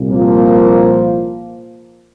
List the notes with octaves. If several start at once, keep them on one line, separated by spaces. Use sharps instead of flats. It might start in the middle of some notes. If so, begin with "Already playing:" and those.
Already playing: C2 A#2
F3 A#3